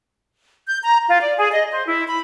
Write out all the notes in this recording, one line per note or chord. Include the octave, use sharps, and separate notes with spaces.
G6
A#5
F4
D5
G#4
D#5
C5
E4
B5